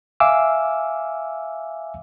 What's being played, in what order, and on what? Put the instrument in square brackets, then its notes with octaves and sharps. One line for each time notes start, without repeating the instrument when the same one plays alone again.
[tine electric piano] E5 F5 G#5 D6 E6